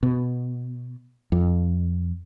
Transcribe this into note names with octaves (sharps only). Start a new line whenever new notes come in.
B2
F2